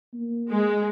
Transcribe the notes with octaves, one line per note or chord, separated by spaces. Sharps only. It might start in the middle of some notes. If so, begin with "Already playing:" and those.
A#3
G#3